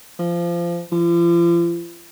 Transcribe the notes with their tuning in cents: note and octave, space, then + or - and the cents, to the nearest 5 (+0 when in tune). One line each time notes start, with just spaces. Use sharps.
F3 -20
F3 -40